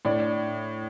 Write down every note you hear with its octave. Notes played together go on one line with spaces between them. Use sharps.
A2 D4